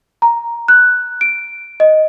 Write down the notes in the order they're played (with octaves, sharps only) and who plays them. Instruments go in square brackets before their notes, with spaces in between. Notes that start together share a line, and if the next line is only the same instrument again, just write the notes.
[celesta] A#5
F#6
D7
D#5